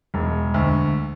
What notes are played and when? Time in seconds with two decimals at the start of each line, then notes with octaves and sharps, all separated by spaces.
0.14 E1
0.54 D2